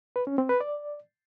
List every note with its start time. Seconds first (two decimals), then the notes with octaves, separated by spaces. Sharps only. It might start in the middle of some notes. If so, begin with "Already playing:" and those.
0.16 B4
0.27 C#4
0.38 C4
0.49 B4
0.61 D5